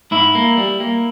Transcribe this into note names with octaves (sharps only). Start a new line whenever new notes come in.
G#2 E4
A#3
G3
A#3